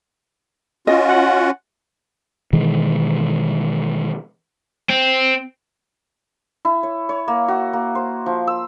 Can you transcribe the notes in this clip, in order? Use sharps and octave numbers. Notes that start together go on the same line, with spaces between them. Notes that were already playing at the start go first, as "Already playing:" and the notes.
C#4 F4 F#4 D#5
F#5
B2 D#3 E3 G#3
C4
E4
C#5
C#5
A#3
F#4
A#3
C5
F3
E6